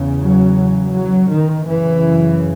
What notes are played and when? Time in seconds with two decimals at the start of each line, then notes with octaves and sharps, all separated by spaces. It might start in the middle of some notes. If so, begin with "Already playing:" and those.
Already playing: E2 C#3
0.20 F#3
0.93 F#3
1.29 D#3
1.65 F#2 C#3 E3